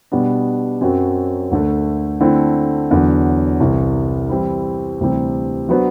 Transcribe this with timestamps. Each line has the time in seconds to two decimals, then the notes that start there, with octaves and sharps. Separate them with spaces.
0.12 B2 G3 B3 D4
0.81 F#2 F#3 C4 F#4
1.51 D2 D3 A3
2.20 D3 A3 C4 E4
2.91 E2 D3 F#3
3.60 C2 C3 E3
4.29 E3 G3 C4 E4
5.00 D2 C3 E3 G3 C4
5.69 F#3 B3 D4 F#4 C5